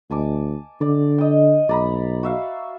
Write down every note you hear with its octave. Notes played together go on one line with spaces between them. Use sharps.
D2 G#5 A5 D6
D3 D5
D#5 G5
B1 D5 A#5 B5
F#4 E5 F5